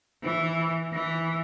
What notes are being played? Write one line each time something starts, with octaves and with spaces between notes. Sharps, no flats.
E3
E3